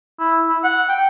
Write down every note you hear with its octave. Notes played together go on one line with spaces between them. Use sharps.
E4
E4
F#5
G5